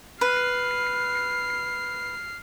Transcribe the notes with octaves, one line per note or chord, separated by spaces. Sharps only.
B4 F6 C7